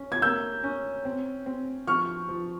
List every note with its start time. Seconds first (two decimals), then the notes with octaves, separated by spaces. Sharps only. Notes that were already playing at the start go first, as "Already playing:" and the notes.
Already playing: C#4
0.12 G#6
0.22 A#3 E6 G6
0.64 C#4
1.05 C4
1.46 C4
1.87 F3 C#6 F6
2.29 F3